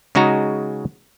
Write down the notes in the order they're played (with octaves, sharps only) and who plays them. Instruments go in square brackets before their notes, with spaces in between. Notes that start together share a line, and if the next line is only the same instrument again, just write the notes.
[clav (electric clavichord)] C#3 G#3 D#4 F#4 A#5